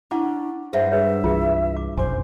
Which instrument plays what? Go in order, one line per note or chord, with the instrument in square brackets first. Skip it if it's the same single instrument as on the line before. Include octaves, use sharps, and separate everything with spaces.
[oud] C#4 [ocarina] D4 [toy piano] E4 F#5 D6
[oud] G2 G#3 [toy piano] G#4 E5 F#5 [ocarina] C5
[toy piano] G#4 B4 C#5 [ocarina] E5
[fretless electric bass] C2 E3 [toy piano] F4 G#4
[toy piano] D6
[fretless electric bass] F1 B1 F#2 [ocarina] C5 [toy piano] G#5 C6 D6